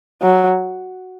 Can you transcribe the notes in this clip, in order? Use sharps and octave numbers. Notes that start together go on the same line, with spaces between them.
F#3